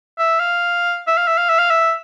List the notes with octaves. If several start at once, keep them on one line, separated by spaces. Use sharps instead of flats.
E5
F5
E5
F5
E5
F5
E5
F5
E5